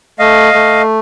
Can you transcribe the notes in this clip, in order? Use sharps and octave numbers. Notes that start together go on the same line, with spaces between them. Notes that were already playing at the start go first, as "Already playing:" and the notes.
A3 D#5 F5
A3